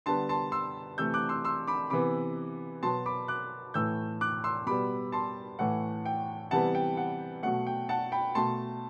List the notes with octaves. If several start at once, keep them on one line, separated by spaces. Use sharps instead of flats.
D3 G3 B3 A5 C6
A5 C6
C6 E6
C3 E3 A3 E6 G6
D6 F#6
C6 E6
C6 E6
B5 D6
C3 E3 B3 B5 D6
B2 F#3 B3 A5 C6
B5 D6
D6 F#6
A2 E3 A3 E6 G6
D6 F#6
C6 E6
B2 G3 B3 B5 D6
A5 C6
A2 E3 A3 F#5
G5
C3 E3 G3 B3 F#5 A5
G5
F#5
B2 F#3 A3 F#5
G5
F#5 A5
G5 B5
B2 A3 A5 C6